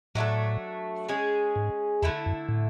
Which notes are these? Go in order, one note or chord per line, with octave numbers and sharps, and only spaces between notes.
A2 F#3 A3 D4 A4
G#3 C#4 G#4
G#2
E2 D3 A3 E4 A4
F#2
A2